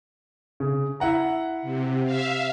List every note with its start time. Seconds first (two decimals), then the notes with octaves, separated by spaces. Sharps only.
0.60 C#3
1.00 E4 F#5 A#5
1.62 C3
2.04 E5 F5